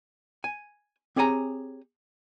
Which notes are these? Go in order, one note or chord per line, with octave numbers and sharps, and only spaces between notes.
G#5
C4 G4 G#4 C#5 G#5 A#5